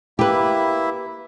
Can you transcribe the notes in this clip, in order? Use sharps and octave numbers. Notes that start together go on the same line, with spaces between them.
A#3 E4 G4 B4 E5